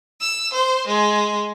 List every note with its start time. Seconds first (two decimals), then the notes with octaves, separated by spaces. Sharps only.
0.21 E6
0.53 C5
0.87 G#3